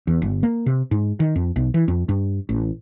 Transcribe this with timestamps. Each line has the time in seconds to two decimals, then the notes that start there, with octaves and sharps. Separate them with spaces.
0.07 E2
0.22 G1
0.43 A#3
0.66 C3
0.91 G#2
1.20 D#3
1.36 F2
1.56 B1
1.74 E3
1.88 F2
2.09 G2
2.49 A1